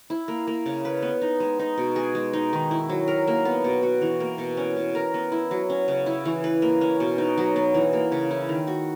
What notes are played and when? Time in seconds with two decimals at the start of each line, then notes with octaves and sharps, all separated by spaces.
0.10 E4
0.28 A#3
0.47 A#3
0.66 C#3
0.85 B4
1.02 B3
1.22 D#4
1.40 G#3
1.59 D#4
1.78 B2
1.96 G#4
2.15 G#3
2.33 D#4
2.53 D#3
2.71 E4
2.89 F#3
3.08 A#4
3.27 A#3
3.45 B3
3.64 B2
3.83 F#4
4.02 E3
4.20 A#3
4.38 B2
4.57 C#4
4.76 B2
4.95 A#4
5.14 B3
5.32 E4
5.51 F#3
5.70 C#4
5.88 C#3
6.06 E4
6.25 E3
6.44 B4
6.62 A#3
6.81 C#4
7.00 B2
7.18 D#4
7.38 F#3
7.56 B3
7.74 E3
7.93 A#3
8.12 C#3
8.31 E4
8.49 D#3
8.67 F#4